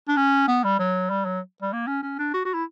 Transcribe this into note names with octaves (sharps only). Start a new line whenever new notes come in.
D4
C#4
B3
G3
F#3
G3
F#3
G3
A#3
C#4
C#4
D4
F#4
F#4
E4